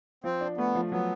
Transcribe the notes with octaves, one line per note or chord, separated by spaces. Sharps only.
F3 C4
D4
A3 B3
F3
F#3 B3